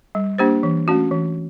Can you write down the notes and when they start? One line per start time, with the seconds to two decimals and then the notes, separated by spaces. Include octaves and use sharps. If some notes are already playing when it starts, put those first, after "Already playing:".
0.15 G3
0.38 A#3 D4 G4 C5
0.63 E3
0.88 A3 C#4 F#4
1.11 E3